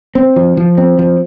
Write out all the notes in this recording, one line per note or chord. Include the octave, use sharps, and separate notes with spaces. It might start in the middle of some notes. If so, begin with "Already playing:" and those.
C4
F3
F3
C4
F3